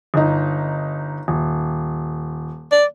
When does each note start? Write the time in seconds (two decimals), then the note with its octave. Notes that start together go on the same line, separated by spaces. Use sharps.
0.14 G1 D#4
1.28 D#1
2.72 D5